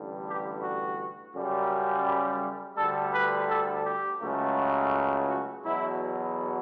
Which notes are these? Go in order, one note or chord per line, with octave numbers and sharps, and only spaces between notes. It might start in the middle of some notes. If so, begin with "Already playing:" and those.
Already playing: A1 G2 D3
G4
F#4
F#2 C#3 G3
G4
D2 D3 G3 A4
B4
A4
G4
C#2 C#3 F#3 A3
F#4
F#4
E2 B2 F#3 E4